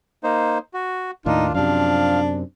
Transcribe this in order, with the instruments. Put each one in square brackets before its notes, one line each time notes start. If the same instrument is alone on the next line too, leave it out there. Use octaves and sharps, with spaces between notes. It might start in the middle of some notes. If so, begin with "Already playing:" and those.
[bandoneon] A#3 D#4 C5
F#4
[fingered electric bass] D#2 A2 D#3 [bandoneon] D4 F4 [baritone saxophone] D#4
[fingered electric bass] F#2 C3 [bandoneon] F3 F5 [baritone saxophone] D4